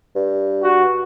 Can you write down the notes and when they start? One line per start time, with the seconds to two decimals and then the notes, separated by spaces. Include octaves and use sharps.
0.16 G2
0.63 F#4